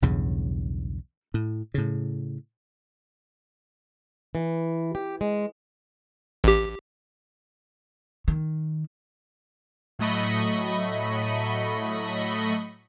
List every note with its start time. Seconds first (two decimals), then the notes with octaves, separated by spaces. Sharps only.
0.02 B1 E2 G2 C#3
1.34 A2
1.74 A2 C#3
4.35 E3
4.95 G4
5.21 G#3
6.44 A1 G4
8.28 D#3
9.99 A2 F#3 A3 D#5 B5 C#6